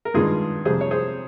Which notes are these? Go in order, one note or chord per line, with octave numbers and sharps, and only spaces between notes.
A#4
G2 D#3 G#3 F4 G#4
F2 C3 G3 G#4 C5
C#5
G#4 C5